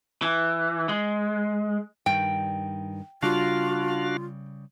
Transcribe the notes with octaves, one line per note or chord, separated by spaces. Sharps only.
E3
G#3
G2 D#3 G5
C#3 G3 D4 F4 F#4 F5